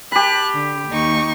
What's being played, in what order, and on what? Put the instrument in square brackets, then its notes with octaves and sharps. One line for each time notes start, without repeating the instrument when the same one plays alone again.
[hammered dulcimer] G4 B5 [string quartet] A5 F#6
[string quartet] D3
D#2 D#4 C#6